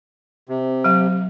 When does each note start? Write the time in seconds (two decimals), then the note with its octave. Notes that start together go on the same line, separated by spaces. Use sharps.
0.49 C3
0.84 F#3 F5